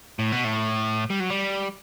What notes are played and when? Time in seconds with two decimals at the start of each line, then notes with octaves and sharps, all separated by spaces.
0.19 A2
0.32 B2
0.45 A2
1.10 G3
1.20 F#3
1.30 G3